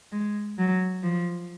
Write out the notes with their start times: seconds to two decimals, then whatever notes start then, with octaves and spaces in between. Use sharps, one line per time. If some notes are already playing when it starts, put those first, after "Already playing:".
0.12 G#3
0.58 F#3
1.03 F3